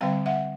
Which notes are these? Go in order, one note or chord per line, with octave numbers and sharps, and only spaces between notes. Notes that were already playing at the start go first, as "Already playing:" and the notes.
D3 G3 C4 F5 G5
E5 F#5